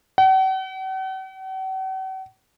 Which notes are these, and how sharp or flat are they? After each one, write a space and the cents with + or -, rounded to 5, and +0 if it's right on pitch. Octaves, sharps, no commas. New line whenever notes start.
F#5 +45